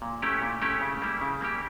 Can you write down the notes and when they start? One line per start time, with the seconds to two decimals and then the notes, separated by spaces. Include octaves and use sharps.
0.02 A#2
0.22 A3 C#4 E4 G4
0.42 A#2
0.62 A3 C#4 E4 G4
0.81 C#3
1.02 G3 A#3 E4 G4
1.21 C#3
1.41 G3 A#3 E4 G4